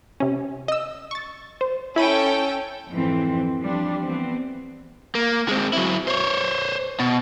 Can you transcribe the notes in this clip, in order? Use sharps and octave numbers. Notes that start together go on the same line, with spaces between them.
C3 C#4
D#5 E6
C#6 A6
C5
C#4 E4 A4 G5 B5 D#7
F2 G#2 E3 C4
F3 G3 D4
E3 B3 C4
A#3
G#3 C4
F#3 E4
C5 C#5
B2